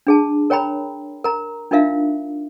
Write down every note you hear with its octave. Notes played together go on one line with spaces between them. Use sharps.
D4 G#4 A5
A#4 C#5 G5 A#5 B5
A#4 A#5
D4 D#4 F4 A#4 E5 F5